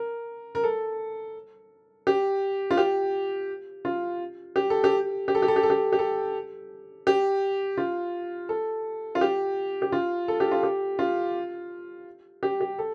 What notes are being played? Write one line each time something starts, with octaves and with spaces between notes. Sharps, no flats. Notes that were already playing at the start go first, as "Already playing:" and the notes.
Already playing: A#4
A#4
A4
G4
F4
G4
F4
G4
A4
G4
G4
A4
G4
A4
G4
A4
G4
G4
A4
G4
F4
A4
F4
G4
G4
F4
A4
G4
F4
G4
F4
G4
G4
A4